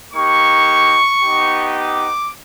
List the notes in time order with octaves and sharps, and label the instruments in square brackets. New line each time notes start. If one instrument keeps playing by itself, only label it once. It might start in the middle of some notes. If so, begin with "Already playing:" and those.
[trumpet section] A#3 D#4 G4 C#6
B3 D#4 G4
D6